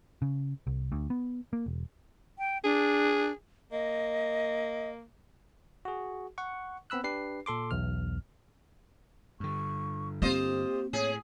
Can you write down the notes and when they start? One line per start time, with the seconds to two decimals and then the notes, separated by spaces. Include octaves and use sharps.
0.22 C#3
0.67 C2
0.92 D2
1.10 B3
1.53 A#3
1.66 E1
2.38 G5
2.64 D4 G#4
3.72 A#3 D#5
5.85 F#4 G#4
6.38 F#5 C#6
6.90 B3 C4 B5 E6 F#6
7.04 D4 G4 B4 C7
7.46 A#2 A4 C6 D6
7.71 B1 E2 F6
9.40 G2 D3 C#6
10.22 A#3 C4 F4 G4 C5 D#5
10.93 A2 G#4 C#5